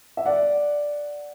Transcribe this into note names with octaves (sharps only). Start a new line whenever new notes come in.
E5
D5 F#5